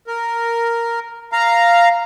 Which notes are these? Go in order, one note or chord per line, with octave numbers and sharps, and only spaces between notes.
A#4
F5 A#5